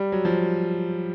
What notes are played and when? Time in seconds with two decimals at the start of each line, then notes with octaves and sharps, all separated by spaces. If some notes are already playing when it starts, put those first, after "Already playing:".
Already playing: G3
0.12 F#3
0.25 F3